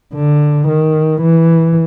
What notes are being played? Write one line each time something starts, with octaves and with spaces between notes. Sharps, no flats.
D3
D#3
E3